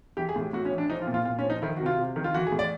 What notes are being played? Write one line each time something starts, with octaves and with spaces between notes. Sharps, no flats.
E3 G4
G#4
A2
G4
A2 F#4
C#4
E3
D4
F3 D#4
F4
A#2
F4
A#2 F4
C#4
F3
D#4
D#3 E4
C3 F#4
F4
C3
D#3
F4
E3 F#4
G#4
A2
D5